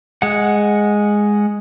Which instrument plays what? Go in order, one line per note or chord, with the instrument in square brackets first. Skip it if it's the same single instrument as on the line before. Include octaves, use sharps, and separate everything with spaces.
[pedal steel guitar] G#3 F#5